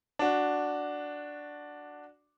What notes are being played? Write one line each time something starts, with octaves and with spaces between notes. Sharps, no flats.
D4 F#4